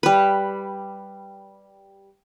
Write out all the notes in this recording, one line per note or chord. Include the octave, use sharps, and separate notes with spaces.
G3 B4